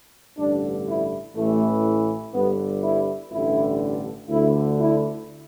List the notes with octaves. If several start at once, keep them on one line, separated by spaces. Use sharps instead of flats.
A1 G2 D3 D4
E4
A1 A2 E3 A3
G1 G2 D3 B3
E4
A1 G2 D3 E4
D2 D3 E4
E4